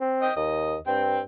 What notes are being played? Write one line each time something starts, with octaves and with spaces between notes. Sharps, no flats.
C4
D#5 G5
D#2 D#5
G2 C4 G5